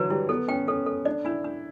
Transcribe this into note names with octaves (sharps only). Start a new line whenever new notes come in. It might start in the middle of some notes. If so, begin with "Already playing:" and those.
Already playing: D3 E3 F#3 B4
G3 E4
B3 A4
C#4 G5
C#4 A4
A4
D4 D5
D4 E4
D4